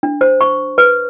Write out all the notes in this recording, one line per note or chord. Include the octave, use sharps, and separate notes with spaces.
D4
C5
C#6
B4